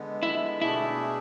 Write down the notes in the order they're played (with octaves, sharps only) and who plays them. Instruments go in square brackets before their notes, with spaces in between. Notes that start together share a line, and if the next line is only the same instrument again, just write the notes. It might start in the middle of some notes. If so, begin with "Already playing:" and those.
Already playing: [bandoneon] D3 G#3 B3
[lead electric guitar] E4
[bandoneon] B2 A3 D4 G#4 [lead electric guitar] E4